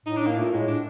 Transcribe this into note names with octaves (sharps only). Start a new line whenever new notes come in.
A2 D#4
D4
A#3
A#2 A3
A2 G#3
D4